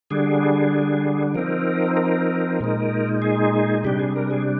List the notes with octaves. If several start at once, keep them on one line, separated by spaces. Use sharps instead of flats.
D3 G3 D4 G#4
F3 C4 D#4 A#4
A#4
A#2 G#3 D#4
G#4
C3 G3 D4 G4
G#4
A#4
G#4